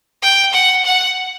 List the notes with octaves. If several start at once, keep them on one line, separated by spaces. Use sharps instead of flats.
G5
F#5
F#5